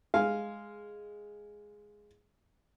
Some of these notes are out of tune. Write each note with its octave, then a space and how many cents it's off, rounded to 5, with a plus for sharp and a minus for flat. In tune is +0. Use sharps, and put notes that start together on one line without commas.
G#3 +0 F5 +0 G#5 +0